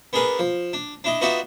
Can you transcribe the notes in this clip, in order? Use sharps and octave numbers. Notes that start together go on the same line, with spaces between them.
B3 D4 G#4 A#4 B4
F3
D4
D4 E4 D#5
B3 D#4 F4 F#4 D5 E5